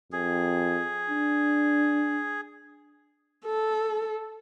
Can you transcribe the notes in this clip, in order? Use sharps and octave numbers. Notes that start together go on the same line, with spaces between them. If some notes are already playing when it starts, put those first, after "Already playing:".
F2 G#4
D4
A4